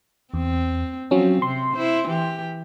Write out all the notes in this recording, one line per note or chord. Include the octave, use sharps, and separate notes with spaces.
E2 C4
F3 F#3 C4 C#4
C3 C6
E4 C5
E3 G4